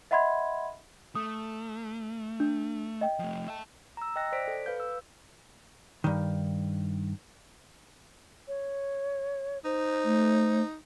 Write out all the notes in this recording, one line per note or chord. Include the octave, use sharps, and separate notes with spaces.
D#5 E5 F#5 B5 C6 G#6
A3 D#6
D4
D#5 G5
F3 A3
E5 A5
A#5 E6
D#5 G5 F#6 A#6
C5 D5 B6 D7
A4
B4 F5 G6
E6
G2 D#3
C#5
D#4 C5
A3